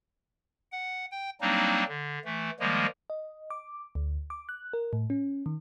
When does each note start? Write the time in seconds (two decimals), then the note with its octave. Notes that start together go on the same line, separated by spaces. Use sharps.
0.72 F#5
1.11 G5
1.41 F#3 G3 A#3 C4 D4 D#4
1.88 D3
2.25 E3 A3
2.60 D#3 F3 G3 G#3 A#3
3.10 D#5
3.50 D6
3.95 D2
4.30 D6
4.49 F#6
4.73 A#4
4.93 A2
5.10 C#4
5.46 D#3